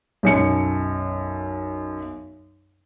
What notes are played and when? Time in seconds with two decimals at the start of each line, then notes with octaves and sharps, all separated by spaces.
0.23 B1 F#2 C#7